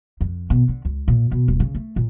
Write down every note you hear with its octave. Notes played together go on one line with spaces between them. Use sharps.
F2
B2
D3
C#2
A#2
B2
D#1
C#3
A3
A#2